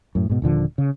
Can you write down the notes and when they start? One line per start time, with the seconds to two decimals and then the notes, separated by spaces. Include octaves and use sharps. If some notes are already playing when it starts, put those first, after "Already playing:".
0.15 F#2 A2
0.29 G#2 B2
0.42 D#1 A#2 D3 F3
0.78 C#3